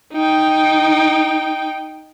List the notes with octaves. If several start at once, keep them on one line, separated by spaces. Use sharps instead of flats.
D#4 G5